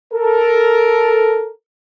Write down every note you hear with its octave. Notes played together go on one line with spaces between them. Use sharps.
A4 A#4